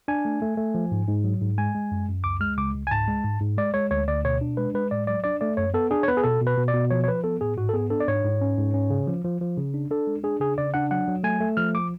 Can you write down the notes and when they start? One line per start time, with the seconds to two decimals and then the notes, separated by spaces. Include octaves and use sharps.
0.08 D4 G#5
0.25 A3
0.42 A3
0.57 A3
0.75 F3
0.91 G#2
1.08 G#2
1.24 F#3
1.42 G#2
1.58 G#3 G#5
1.75 G#3
1.91 F#2
2.08 F#2
2.24 C#2 D6
2.40 G#3 F6
2.58 C#2 D6
2.75 C#2
2.87 G#5
2.91 G#2 A5
3.08 G#3
3.24 G#2
3.40 G#2
3.58 G#3 D5
3.74 G#3 C#5
3.91 D2 C#5
4.08 D2 D5
4.24 B2 C#5
4.41 D4
4.57 G#3 B4
4.74 G#3 B4
4.91 A2 D5
5.07 F#3 D5
5.24 D4 D5
5.41 A3 D5
5.57 F#2 C#5
5.74 B3 A4
5.91 D4 G#4
6.03 C#5
6.08 B3 B4
6.17 G#4
6.24 B2 A4
6.41 B2
6.47 B4
6.57 B2
6.68 D5
6.74 B2
6.90 F3 C#5
7.04 C#5
7.08 F3 B4
7.24 B3 A4
7.41 A2 G#4
7.57 G#2 F#4
7.69 A4
7.74 B3 G#4
7.90 D4 A4
8.00 D5
8.08 G#2 C#5
8.24 G#2
8.41 C#4
8.58 G#2
8.74 C#4
8.90 C#3
9.08 F3
9.25 F3
9.41 F3
9.57 C#3
9.74 D4
9.91 D4 A4
10.07 G#3
10.24 D4 G#4
10.40 C#3 G#4
10.58 C#3 D5
10.74 D4 F#5
10.91 F#3 F#5
11.08 F#3
11.24 A3 G#5
11.41 A3
11.57 F3 F6
11.75 D6